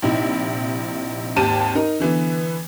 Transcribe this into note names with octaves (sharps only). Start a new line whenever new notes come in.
A#1 C3 D#4 E4
G#1 D#2 G4 A5 D#7
D#4 A#4
D3 E3 B3